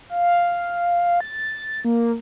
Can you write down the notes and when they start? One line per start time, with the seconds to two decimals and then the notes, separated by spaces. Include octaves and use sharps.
0.10 F5
1.21 A6
1.85 A#3